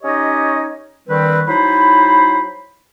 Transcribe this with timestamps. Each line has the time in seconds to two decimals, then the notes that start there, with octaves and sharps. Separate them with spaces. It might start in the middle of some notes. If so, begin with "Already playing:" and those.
0.03 C#4 D#4 G4 C#5 D#5
1.08 D3 D#3 G3 C4 B4
1.48 F#3 D#4 E4 C5 B5